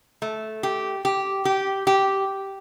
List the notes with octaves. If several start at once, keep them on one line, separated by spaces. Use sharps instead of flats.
A3
G4
G4
G4
G4